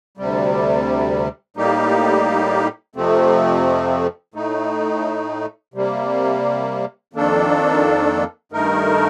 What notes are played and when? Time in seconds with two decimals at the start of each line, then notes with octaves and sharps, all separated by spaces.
0.17 D2 C3 G3
1.56 A2 G3 A#3 D#4 G4
2.95 F2 C3 F3 A3 C4
4.34 A2 A3 D#4
5.74 C3 G3 A#3
7.13 F2 D#3 A#3 D4 A4
8.52 G2 D#3 A3 D#4 A#4